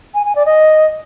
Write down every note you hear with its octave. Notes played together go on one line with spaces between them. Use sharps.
G#5
G#5
D5
D#5